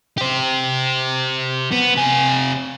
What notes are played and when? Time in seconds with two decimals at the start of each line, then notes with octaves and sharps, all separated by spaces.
0.18 G4 C5
1.72 B3
1.95 C3 G#5